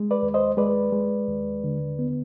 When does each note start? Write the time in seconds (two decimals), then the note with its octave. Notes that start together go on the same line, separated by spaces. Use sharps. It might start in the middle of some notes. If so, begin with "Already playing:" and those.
Already playing: G#3
0.11 B4 D5
0.23 D#2
0.34 C5 D#5
0.57 G#3 B4 D5
0.92 G#3
1.28 D#2
1.64 D3
1.99 B3